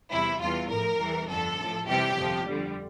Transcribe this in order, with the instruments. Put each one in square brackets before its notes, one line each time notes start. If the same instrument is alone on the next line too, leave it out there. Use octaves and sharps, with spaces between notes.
[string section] E2 C3 G3 E4
E2 E3 G3 F4
A1 A2 F3 A#4
E2 E3 G3
G1 F2 D3 A4
A1 A2 F3
F2 C3 E3 G3 G4
G1 F2 C3 F3
F2 D3 G3